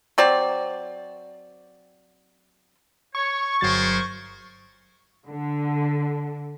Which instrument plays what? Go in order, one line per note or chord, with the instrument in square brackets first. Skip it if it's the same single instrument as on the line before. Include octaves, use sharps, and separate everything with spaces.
[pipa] F#3 C4 D5
[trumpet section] C#5 [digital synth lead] C#6
[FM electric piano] G1 F#3 A6 [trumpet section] G#4 A#4 C5
[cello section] D3